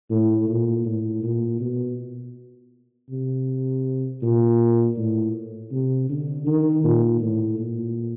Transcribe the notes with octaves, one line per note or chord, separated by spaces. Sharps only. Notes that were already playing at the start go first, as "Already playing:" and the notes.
A2
A#2
A2
A#2
B2
C3
A#2
A2
C3
D3
D#3
A#2
A2
A#2